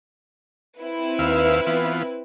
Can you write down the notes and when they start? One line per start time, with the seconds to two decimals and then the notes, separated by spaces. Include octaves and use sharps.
0.80 C4 E4 B4
1.19 D#2 E5 F5
1.67 E3 B3 F4